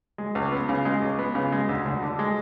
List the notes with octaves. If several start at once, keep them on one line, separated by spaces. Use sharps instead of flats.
G#3
C#2
B3
C#3
G#3
C#2
B3
C#3
G#3
D2
D2
D3
G#3